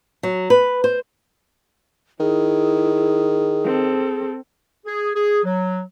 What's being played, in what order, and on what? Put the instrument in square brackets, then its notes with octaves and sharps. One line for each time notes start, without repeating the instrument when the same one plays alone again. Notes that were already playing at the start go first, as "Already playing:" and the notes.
[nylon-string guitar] F#3
B4
C5
[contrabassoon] D#3 [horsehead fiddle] E4 [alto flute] G#4
[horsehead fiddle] C4 A4
[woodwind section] G#4
G#4
F#3